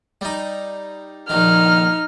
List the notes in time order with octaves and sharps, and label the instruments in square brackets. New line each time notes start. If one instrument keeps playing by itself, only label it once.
[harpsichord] G3 D#4
[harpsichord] A#1 D#3 [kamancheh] D#4 F6